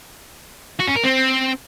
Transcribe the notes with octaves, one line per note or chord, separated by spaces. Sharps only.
F#4
C#4
A#4
C4